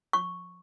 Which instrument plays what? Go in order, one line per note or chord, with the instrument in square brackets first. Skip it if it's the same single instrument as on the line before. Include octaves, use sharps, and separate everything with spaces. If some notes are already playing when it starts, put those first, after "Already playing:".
[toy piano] C#6